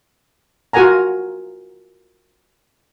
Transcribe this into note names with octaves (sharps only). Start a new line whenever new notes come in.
F4 F#4 A#4 F#5 G#5 A#5